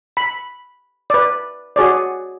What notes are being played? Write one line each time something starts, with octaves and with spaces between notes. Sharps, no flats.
B5
B4 D5
F#4 G#4 C#5 D5